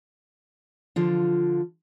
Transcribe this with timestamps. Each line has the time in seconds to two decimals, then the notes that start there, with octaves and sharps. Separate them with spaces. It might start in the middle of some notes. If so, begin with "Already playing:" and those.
0.96 D3 F3 F4